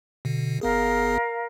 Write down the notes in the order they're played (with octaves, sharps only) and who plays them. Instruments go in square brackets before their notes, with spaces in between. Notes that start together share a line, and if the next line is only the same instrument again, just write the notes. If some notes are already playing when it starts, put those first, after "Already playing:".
[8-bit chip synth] B2 D3
[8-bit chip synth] G1 B3 G#4 [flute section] A#4 F5